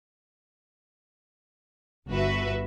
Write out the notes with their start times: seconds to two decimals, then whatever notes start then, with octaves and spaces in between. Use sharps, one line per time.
2.08 G1 F#4 B4 E5